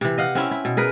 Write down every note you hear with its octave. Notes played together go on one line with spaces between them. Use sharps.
C3 E3
D#5 F5 F#5
C4 C#4 E4
E4
B2
G#4 A#4 B4